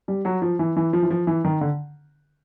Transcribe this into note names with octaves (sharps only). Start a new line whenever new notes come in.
G3
F#3
F3
E3
E3
F3
E3
F3
E3
D#3
D3